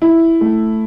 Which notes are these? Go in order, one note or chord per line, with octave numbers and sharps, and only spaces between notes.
E4
A3